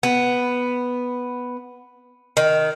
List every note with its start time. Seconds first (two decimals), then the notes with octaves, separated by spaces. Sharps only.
0.03 B3
2.37 D#3